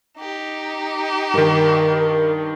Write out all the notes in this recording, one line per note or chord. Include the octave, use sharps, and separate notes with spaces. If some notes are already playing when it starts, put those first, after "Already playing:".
D#4 G4
G2 D#3 A#4